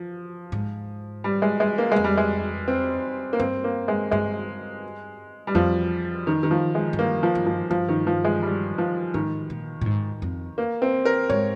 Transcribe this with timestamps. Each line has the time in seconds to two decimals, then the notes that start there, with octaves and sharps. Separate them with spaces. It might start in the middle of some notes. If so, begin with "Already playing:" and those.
Already playing: F3
0.52 G#2
1.24 G3
1.42 G#3
1.60 G#3
1.78 A#3
1.92 F2 G#3
2.04 G3
2.18 G#3
2.68 C4
3.33 A#3
3.40 G2 C4
3.64 A#3
3.88 G#3
4.11 G2 G#3
5.47 G3
5.55 F2 F3
6.27 D#3
6.43 D#3
6.51 F3
6.75 G#3
6.93 G#2
6.98 G2 A#3
7.23 F3
7.35 G2
7.47 F3
7.71 G2 F3
7.88 D#3
8.07 F3
8.25 G#3
8.42 G3
8.78 F3
9.14 G#2 D#3
9.50 A#2
9.81 A#2
9.86 G#2
10.22 F2
10.58 A#3
10.82 C4
11.05 A#4
11.30 G#2 C#5